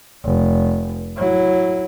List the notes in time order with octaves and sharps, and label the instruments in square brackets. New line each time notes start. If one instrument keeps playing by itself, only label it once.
[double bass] F1
F#3 E4